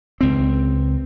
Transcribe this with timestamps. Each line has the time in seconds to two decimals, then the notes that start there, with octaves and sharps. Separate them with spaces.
0.21 C#2 C4